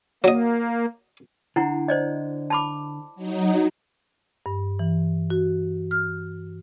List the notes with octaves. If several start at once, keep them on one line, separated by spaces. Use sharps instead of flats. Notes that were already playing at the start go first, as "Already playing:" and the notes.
F#3 A#3 D#5
D3 E4 F#5 A#5
C5 D5 D#5
A5 B5 D6
F#3 D#4
G2
E3
F#4
F6